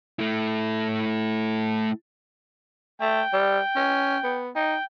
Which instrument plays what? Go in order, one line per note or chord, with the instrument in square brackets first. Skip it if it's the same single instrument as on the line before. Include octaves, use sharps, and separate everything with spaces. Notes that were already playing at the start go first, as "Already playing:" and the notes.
[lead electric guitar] A3 E4
[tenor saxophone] A3 [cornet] G5
[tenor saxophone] G3
C#4
B3
[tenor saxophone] D#4 [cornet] G5